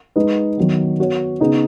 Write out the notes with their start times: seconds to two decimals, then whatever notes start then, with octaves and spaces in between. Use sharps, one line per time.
0.16 G#3 D#4 B4 D#5
0.58 D#3 F#3 B3
0.99 B3 F#4 C#5
1.40 C#3 B3 D#4 G#4 D#5